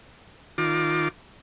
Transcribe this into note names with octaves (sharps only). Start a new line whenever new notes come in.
D#3 F4 D6